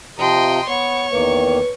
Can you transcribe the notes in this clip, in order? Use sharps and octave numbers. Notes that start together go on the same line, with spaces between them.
C3 F3 D#5 G5 A#5 C6
B3 C#5 C#6
E2 D#3 A#3 B4